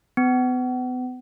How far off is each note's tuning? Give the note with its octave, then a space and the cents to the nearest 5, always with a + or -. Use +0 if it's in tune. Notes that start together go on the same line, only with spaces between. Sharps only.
B3 +35